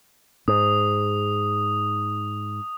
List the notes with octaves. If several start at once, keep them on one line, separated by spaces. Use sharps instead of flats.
G#2 D#6